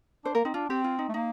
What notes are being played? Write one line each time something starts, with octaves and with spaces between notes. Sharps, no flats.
D4 C5
A#3 A#4
C4 D#4
D4 F4
C4 G4
F4
D#4
A3
A#3 D#4